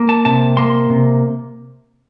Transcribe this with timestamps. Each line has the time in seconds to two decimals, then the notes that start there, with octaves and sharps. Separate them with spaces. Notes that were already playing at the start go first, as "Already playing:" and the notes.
Already playing: A#3
0.09 A5
0.25 C3 A5
0.57 A#3 C6
0.90 C3